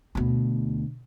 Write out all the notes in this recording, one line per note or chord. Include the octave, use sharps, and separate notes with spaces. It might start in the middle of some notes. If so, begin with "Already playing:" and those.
D2 B2